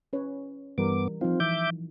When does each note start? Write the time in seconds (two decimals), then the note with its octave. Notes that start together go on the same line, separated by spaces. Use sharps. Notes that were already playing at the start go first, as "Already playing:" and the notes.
0.13 C#4 B4 C#5
0.78 G2 E3 G3 B3 A#4 D6
1.21 F3 C4 D#4 F4
1.40 E3 E5 D6 G6